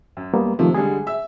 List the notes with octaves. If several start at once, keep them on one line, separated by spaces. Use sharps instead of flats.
F#2
G3 A#3 B3
C3 D#3 F3 A3
D3 G3 G#3 G#4
E5 E6